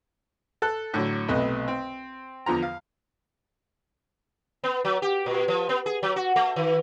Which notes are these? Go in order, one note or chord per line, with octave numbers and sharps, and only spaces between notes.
A4 A5 F#6
A2 D3 F#3
B1 C3 A3 B4 D#5
C4
E2 D3 F3 A#5
F5
B3
F#3
G4
A#2
F3
B3
G#4
F#3
F#4
A3
D#3